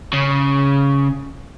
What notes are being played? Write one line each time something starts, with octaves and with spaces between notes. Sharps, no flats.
C#3